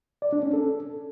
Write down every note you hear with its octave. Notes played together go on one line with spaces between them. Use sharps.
D5
D4
C#4
A4